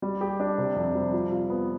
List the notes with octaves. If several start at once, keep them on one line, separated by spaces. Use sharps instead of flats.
G3
G4
D4
C3
F2
G3
F3
F4
B3